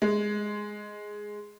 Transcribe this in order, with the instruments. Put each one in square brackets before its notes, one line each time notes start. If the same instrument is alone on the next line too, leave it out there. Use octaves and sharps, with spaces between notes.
[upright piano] G#3